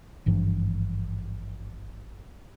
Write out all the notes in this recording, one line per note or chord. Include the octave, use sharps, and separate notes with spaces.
G#1 G2 E3 F3